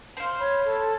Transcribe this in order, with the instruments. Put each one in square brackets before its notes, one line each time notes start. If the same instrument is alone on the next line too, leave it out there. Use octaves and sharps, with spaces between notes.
[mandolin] C5 F5
[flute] C#5 [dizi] B5
[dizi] A4